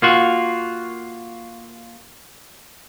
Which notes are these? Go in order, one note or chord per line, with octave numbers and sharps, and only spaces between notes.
A#3 F4 F#4